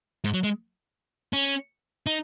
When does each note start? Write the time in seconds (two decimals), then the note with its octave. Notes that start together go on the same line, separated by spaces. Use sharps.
0.24 G#2
0.34 F#3
0.43 G#3
1.33 C#4
2.06 D#4